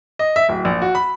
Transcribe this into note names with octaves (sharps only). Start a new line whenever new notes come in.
D#5
E5
D1
A#1
F#4
B5